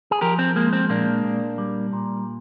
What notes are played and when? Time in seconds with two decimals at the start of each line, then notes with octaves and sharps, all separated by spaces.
0.11 G#4
0.21 F3 G4 A#4
0.39 C4
0.56 G#3 A#3
0.73 C4
0.90 A#2 A#3 D4
1.24 A#2
1.58 G3
1.93 A#2